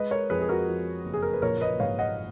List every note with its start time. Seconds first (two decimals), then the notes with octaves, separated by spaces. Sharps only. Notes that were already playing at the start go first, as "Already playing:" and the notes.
Already playing: G#3 B4 D#5
0.11 A#4 C#5
0.30 F2 G#4 B4
0.41 G#4
0.49 F#4 A#4
0.68 F3
1.05 F#1
1.14 G#4
1.22 A#4
1.33 B4
1.42 A#1 A#4 C#5
1.61 B4 D#5
1.80 G#2 C#5 F5
1.99 D#5 F#5